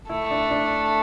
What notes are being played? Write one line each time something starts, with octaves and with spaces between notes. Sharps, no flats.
A3 E4
D4
D4